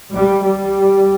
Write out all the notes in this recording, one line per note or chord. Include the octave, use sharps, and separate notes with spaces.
G3
G3